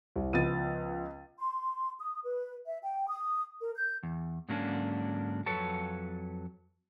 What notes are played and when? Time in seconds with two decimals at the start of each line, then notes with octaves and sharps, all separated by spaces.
0.16 C2
0.33 C#2 F3 B3 A6 D#7
1.39 C6
1.99 D#6
2.23 B4
2.66 E5
2.83 G5
3.09 D#6
3.62 A#4
3.76 G6
4.03 E2
4.48 G#2 D3 F#3 A#3 C#4 D4
5.46 F2 F#3 A4 B4 C#5 A5